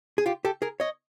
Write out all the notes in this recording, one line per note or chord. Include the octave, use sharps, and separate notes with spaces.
G#4
F4 G4
G4 A4
G#4 A#4
C#5 D#5